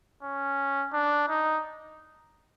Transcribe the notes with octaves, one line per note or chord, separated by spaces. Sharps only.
C#4
D4
D#4